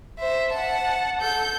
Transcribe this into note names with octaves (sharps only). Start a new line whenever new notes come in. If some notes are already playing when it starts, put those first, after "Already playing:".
C5 E5
F#5 A5
A4 G6